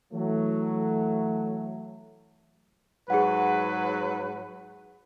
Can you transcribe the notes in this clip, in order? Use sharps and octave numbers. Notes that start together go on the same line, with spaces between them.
E3 F#3 A3
G#2 F#3 G#4 B4 F#5